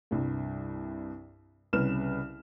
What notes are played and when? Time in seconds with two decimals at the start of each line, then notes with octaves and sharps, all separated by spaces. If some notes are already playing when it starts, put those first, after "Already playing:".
0.11 C2 G2
1.73 C2 C#3 B4 F6 E7